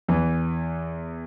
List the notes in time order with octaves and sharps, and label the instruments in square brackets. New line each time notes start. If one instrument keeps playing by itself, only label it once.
[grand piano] E2 E3